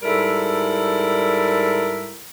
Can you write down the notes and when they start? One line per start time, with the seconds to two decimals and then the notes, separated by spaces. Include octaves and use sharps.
0.03 G#2 G3 E4 A4 A#4